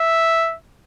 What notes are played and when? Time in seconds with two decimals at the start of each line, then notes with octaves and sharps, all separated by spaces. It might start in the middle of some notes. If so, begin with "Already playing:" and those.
Already playing: E5